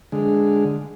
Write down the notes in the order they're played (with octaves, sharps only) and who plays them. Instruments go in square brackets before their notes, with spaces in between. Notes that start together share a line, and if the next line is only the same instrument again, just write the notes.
[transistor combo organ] D3 G#3